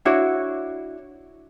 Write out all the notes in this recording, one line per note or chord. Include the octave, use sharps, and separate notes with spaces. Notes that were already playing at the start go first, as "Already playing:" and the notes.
D4 E4 F#4 C#5